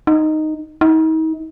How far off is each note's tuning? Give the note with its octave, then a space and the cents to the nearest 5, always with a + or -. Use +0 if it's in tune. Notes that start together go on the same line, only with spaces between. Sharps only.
D#4 -5
D#4 +40